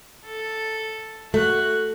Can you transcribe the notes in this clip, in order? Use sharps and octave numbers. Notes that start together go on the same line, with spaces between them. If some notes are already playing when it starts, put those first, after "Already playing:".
A4
A3 F#4 F#6